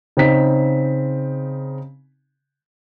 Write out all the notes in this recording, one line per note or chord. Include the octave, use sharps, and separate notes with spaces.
C#3 C4 D#4 B6